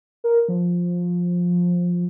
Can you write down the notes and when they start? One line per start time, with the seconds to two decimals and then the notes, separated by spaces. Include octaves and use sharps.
0.24 A#4
0.48 F3